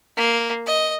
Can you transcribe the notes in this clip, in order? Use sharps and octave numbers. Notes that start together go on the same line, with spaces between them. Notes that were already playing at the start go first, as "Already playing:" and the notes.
A#3
D#5